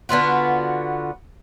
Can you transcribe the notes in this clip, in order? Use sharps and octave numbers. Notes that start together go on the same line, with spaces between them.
D3 B3 F4 F#4